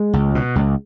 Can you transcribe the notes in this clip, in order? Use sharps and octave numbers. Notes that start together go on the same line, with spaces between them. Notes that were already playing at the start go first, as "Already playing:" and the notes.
Already playing: G#3
C#2
B2
C#2